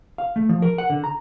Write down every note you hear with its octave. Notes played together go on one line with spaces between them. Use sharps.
F5
A3
F3
A#4
F#5
D3
A#5